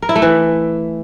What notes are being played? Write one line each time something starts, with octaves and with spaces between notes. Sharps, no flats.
A#4
E4
A3
E3